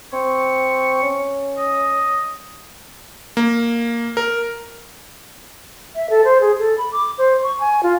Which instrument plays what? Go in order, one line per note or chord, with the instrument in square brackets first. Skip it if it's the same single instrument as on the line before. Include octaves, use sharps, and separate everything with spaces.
[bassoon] C4 [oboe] C#6
[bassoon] C#4
[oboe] D#5
[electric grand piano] A#3
A#4
[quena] E5
A4
C5
G#4
A4
B5
D6
C5
C#6
G#5
F4